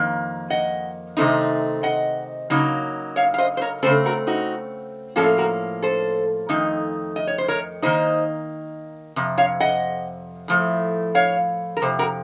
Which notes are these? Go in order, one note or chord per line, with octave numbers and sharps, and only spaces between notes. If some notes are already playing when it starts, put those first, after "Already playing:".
Already playing: F2 D#3 A#3
D#5 F#5
C3 D#3 A3 C4 D#4
D#5 F#5
C#3 F#3 A#3 D#4
C#5 F5
F5
C5 D#5
C5
A#4 C#5
C#3 A3 C4 A4 C5
F#4 A#4
D#4 F#4
A2 F3 A#3 C#4 F4 A4
F#4 A#4
A4 C5
F2 D#3 A3 D#4
D#5
C#5
C5
A#4 C#5
D#3 A#3 D#4 C5 D#5
F2 C3
C#5 F5
D#5 F#5
A2 F3 A3
C#5 F5
A#4
F2 C3 C5
F#4 A#4